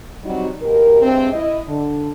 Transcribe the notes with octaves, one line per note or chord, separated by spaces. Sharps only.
F#3 G3 C4 D#4 F#4
D#2 B2 G4 A#4
G2 C3 G#3 C4
E4 D#5
D3